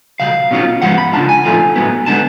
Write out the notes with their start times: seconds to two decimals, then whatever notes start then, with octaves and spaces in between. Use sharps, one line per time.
0.20 C#2 B2 F#3 F5
0.51 B2 F#3 C#4 F4
0.82 G#2 F3 G#3 B3 F#5
0.98 B5
1.13 C#3 G#3 D4 F4 A5
1.29 G#5
1.44 B1 A2 F3 A3 F4
1.76 A2 F#3 B3
2.06 D3 G#3 B3 A5